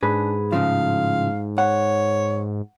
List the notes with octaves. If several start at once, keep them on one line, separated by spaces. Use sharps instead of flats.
G#2 D4 G#4 B4
A2 C#3 F3 F5
C#5 F#5